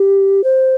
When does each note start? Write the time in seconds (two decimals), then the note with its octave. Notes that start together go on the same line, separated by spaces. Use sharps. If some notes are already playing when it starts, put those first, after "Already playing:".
Already playing: G4
0.44 C5